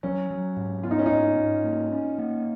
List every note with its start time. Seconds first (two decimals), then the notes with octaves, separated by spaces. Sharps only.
0.03 F#3 C#4
0.30 F#3
0.56 G#2
0.83 B3 F4
0.91 D#4
0.99 C#4
1.06 D#4
1.11 G#2
1.37 G#2
1.64 A#3
1.92 C#4
2.18 A#3